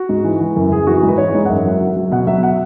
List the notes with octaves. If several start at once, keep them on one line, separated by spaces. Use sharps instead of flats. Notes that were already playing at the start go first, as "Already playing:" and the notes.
Already playing: F#4
G#2
E3
E3
F#2
F#2 G#4
E3 F#4
G#2
B4
E3 C#5
G#2
F#5
F#2 E5
F#3
F#3
F#3
B2 F#5
F#3 E5
F#5